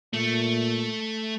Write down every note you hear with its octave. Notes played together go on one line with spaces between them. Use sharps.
A#2 A3